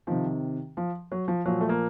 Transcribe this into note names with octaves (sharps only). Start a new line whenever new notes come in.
C3 D#3 F3
F3
F#3
F3
A#2 F3 F#3
A3
A#3